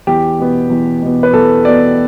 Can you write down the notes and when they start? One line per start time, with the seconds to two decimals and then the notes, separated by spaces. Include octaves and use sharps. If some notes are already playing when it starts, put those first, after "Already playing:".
0.07 E2 G4
0.39 B2 B3
0.70 E2
1.02 B2 B3
1.23 B4
1.33 E2 A4
1.65 B2 B3 D5